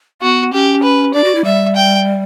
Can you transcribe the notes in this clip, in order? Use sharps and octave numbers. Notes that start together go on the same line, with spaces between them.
B3 F#4
C#4 G4
B4
D4 D5
F#4
E4
G3 E5
G5